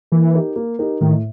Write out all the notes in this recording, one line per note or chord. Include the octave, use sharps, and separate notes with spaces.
E3 A#3
D#4 G4 A#4
A#3
D#4 G4 A#4
A2 D#3